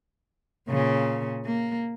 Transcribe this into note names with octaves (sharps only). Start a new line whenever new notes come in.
A#2 C#3
A#3